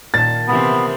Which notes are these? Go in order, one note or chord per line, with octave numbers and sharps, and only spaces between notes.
A#2 D#3 A5 A6
C3 E3 B3 C4